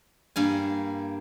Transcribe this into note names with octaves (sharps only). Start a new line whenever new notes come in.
G2 A#3 G#5